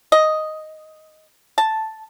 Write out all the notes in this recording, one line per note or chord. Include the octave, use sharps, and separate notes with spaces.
D#5
A5